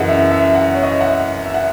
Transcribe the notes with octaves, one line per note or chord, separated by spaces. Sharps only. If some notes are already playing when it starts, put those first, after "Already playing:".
Already playing: F#2 C#3 E3 D#5 F#5
E5
E5
F#5
C#5
D#5
E5
F#5
E5
F#5